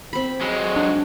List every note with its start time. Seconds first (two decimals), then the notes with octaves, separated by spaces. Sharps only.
0.13 C4 B5
0.42 F#3 G#3
0.76 D4